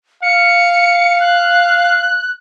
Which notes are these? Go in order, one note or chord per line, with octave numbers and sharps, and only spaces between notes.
F5 C#7
F#6